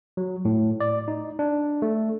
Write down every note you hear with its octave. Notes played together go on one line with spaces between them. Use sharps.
F#3
A2
D5
D#4
D4
A3